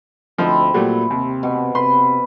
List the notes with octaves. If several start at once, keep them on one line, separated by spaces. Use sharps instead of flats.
D2 F3 C4 D#4 E4
A#2 F#3 G3 A3
D#2 C3
B2
C3 B4 C6